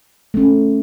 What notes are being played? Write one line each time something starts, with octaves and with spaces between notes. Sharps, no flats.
A3 C#4